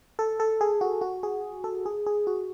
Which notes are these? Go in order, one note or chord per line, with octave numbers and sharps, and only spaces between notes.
A4
A4
G#4
F#4
F#4
G#4
A4
G#4
G#4
F#4